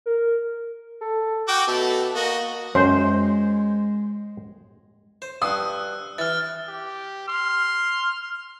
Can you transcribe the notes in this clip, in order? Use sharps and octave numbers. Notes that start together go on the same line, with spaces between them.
A#4
A4
F#4 G5 D6
B2 A3 A4
A#3 F#4 D#5
F#2 G#3 C5
C5
G2 C6 D#6 E6 F#6
E3 F6 A6
G4
C6 F6